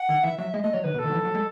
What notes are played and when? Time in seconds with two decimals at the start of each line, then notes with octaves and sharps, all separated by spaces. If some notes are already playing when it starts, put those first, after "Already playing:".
Already playing: F#5
0.09 D#3
0.23 E3 E5
0.38 F#3 E5
0.53 G#3 D#5
0.63 A3 D#5
0.74 F#3 C#5
0.84 D#3 B4
0.94 B2
0.99 A4
1.04 D#3
1.10 F#3
1.14 E3
1.25 F#3
1.35 G#3